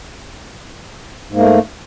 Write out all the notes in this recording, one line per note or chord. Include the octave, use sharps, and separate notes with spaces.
G#2 A3 A#3